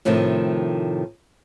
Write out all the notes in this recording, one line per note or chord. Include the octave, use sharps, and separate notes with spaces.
A2 C3 D#3 F3 A3